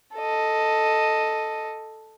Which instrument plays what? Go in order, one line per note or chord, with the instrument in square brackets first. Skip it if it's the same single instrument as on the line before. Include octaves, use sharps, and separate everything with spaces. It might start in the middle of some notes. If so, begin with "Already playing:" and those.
[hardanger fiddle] A4 D#5